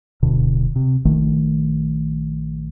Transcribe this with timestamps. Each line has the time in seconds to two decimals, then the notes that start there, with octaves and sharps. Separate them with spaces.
0.23 D1 B2 D3
0.76 C3
1.05 A#1 D#3 A3